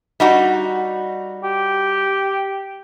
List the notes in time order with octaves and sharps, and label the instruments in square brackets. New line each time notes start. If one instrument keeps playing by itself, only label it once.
[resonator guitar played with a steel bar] G3 D#4 F#4
[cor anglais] G4